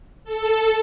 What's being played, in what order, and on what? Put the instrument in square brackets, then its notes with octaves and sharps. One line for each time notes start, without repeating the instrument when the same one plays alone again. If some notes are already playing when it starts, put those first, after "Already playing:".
[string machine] A4